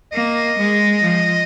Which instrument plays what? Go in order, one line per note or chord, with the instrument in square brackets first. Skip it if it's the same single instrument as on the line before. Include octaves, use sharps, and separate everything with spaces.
[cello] A#3 [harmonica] D#5
[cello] G#3
F3